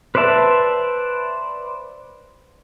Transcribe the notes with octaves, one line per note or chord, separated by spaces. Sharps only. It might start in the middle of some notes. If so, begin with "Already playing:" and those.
B4 C5 D5 E5 A5